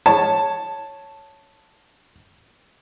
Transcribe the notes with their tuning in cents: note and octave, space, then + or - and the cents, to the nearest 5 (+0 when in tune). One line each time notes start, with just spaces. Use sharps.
C#5 +0 A5 +0